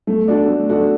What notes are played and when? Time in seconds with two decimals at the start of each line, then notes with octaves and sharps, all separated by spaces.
0.07 A3
0.28 D4 F#4 A4
0.48 A3
0.69 D4 F#4 A4